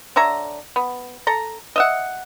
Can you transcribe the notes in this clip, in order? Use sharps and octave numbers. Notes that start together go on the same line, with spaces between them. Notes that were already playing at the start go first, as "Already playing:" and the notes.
D3 C#5 E5 A#5
B3
A4 A#5
D#5 E5 F#5